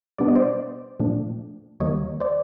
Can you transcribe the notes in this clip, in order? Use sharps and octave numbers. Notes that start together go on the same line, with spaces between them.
B2 G3 B3 D4 D5
D#5
C5 D5
A#2 F3 A3 D4
D#2 D#3 G3 A#3 C#5 D#5
C5 D5